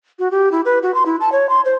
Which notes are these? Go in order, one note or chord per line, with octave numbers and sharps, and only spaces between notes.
F#4
G4
E4
B4
F#4
C6
E4
A5
C#5
C6
C5